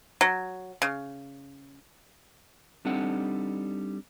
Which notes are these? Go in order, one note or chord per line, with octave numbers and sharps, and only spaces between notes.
F#3
C#3
G3 C4 D4 D#4 A4 F#5